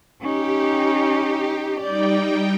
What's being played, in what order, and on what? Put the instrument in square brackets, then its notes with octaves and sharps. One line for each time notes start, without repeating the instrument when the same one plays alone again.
[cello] C#4 D#4 [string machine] G4
[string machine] G3 D#4 G5 [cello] D5